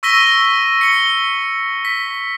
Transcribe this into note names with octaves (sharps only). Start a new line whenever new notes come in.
C#6 E6 A#6 B6 D#7 G7
C#7 G7
B6